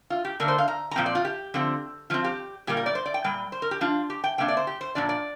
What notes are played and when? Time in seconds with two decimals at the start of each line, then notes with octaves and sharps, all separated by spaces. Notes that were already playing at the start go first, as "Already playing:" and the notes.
0.10 F4
0.25 G4
0.40 D3 A#3 D4 A#4
0.48 C5
0.58 F5
0.68 A#5
0.91 A#5
0.96 A#2 F3 C4 G5
1.06 D5
1.15 F4
1.25 G4
1.54 D3 F3 C4
2.10 F3 C4 F4
2.24 G4
2.67 A#2 G3 A#3 G4
2.77 A#4
2.86 D5
2.95 C5
3.06 D5
3.14 G5
3.24 A#2 G3 G5
3.52 C5
3.62 A#4
3.71 G4
3.81 F3 D4 F4
4.10 G4
4.24 G5
4.38 C3 A#3 D4 G5
4.48 D5
4.57 C5
4.67 G4
4.81 C5
4.95 A#2 F3 D4 D5
5.09 D5